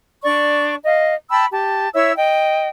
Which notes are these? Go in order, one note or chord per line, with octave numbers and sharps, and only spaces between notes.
D4 D5 C#6
D#5 F5
G5 A5 B5 E6
G4 A5
E4 C#5 E5 E6
D#5 G5